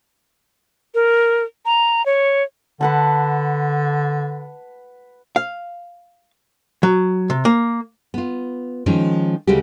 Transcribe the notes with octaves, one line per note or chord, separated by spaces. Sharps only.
A#4
A#5
C#5
D3 B4 F#5 A5
F5
F#3
C3
A#3
B3 F4
D#3 F3 G#3 C#4 D#4
D2 C#3 G#3 F#4 G4